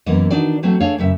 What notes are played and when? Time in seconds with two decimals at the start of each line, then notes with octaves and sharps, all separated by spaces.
0.06 F#2 E3 A#3 B3 E4 D#5
0.31 D#3 D4 D#4 F#4 D5
0.63 F#3 A3 C4 F#4
0.80 A3 D4 G#4 C#5 F5
0.98 F#2 C#3 E5